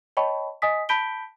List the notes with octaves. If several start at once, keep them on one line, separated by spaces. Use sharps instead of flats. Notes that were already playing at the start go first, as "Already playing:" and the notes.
C#5 D#5 G5 A5 B5 C#6
D#5 G#5 D#6 B6
A5 B5 G6 B6 D7 G7